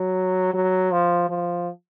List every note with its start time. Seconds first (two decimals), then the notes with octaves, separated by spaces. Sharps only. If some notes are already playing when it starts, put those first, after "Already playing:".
Already playing: F#3
0.54 F#3
0.91 F3
1.29 F3